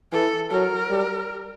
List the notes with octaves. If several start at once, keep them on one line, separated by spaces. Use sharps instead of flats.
E3 A4
F#3 A#4
G3